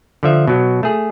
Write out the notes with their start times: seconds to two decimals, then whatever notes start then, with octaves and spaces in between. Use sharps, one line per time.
0.23 D3 F3 E5
0.48 B2 F#3
0.83 A3 G#4